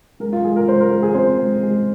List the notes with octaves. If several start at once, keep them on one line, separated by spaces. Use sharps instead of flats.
G#3 A#4
F4
G#3 G#4
A#4
G#3 C5
A#4
G#3
G#4
C4 C5
G#3
G#3